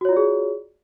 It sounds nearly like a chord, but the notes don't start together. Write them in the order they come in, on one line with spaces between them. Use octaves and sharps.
F#4 C#5 F4 D5 G#4